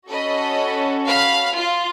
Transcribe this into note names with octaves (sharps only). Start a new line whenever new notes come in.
C#4 F#4 A4 D#5 B5
F5 B5 F6
F4